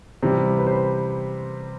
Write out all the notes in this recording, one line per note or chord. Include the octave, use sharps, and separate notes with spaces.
C3 E3 G3
B4
C5